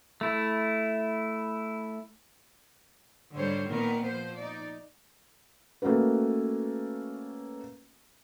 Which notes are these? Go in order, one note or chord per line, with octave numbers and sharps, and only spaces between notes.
A3 E4
G#2 D3 G3 C5 C#5
A#2 D#3 B3 A#4
F3 C5
D#4 D5
A3 A#3 C#4 F#4 B4